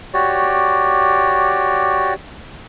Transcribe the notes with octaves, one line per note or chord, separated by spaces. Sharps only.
F#4 G4 C#5 D5